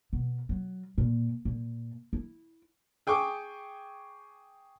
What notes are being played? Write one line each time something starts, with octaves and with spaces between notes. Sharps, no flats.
B2
F#3
A#2
A#2
E4
G#4 G5 G#5 C#6 D6